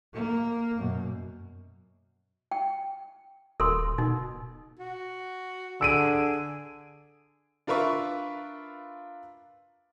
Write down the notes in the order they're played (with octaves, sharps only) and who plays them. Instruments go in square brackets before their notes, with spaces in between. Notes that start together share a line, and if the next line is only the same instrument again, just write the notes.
[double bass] A#3
F#2 B2
[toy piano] G5
[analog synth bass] D#1 [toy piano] A4 A#4 C6
[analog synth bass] B2 [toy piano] D#4
[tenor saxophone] F#4
[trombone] D3 [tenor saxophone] G#4 [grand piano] E6 D7 D#7
[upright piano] D4 F4 A#4 B4 E5 C#6